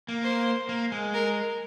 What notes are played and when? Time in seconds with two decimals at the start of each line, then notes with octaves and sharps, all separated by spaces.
0.08 A#3
0.23 C5
0.69 A#3
0.92 G#3
1.14 A#4